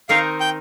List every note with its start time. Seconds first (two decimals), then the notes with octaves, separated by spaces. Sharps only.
0.09 D#3 C4 D#4 A#4 F5
0.40 G5